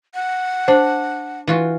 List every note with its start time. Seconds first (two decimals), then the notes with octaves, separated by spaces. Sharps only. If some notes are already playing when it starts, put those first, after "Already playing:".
0.14 F#5
0.68 D4 C5
1.47 E3 F4 F#4